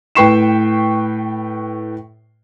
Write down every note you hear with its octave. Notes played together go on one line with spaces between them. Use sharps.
A2 B4 G5 C#6 C7 E7